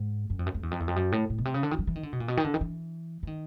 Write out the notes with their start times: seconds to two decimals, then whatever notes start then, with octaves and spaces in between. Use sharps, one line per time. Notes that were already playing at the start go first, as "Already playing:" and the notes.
Already playing: G#2
0.30 F#2
0.39 F2
0.46 F#2
0.54 F2
0.63 E2
0.71 F2
0.80 E2
0.88 F2
0.96 F#2
1.12 A2
1.30 A2
1.38 B2
1.45 C3
1.54 C#3
1.63 D3
1.71 D#3
1.79 F#3
1.87 E3
1.96 D#3
2.03 D3
2.13 B2
2.20 A#2
2.28 B2
2.37 D#3
2.44 D3
2.54 D#3
2.61 E3
3.23 E3
3.27 D#3